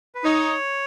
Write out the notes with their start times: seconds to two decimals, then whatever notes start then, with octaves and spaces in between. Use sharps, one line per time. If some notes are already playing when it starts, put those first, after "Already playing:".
0.15 B4
0.25 D#4 C#5